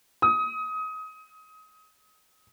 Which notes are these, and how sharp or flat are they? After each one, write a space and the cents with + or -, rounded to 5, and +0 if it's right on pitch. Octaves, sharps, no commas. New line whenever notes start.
D#6 +25